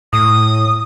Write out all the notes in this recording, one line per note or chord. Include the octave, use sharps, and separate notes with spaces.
A2 D#6